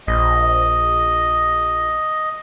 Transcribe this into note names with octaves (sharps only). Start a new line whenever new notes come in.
A#1 D#5